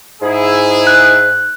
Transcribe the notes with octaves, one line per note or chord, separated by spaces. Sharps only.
G#2 E4 G#4
F#6